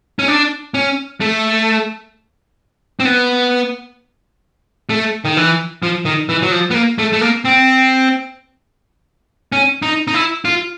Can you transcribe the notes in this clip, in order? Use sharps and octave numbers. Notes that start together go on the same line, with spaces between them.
C#4
D4
C#4
A3
C4
B3
A3
D#3
E3
F3
D#3
E3
F#3
F3
B3
A#3
A3
A3
A#3
C4
C#4
D#4
D#4
E4
F4